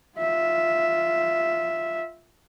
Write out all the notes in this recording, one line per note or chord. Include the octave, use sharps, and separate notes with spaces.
F4 E5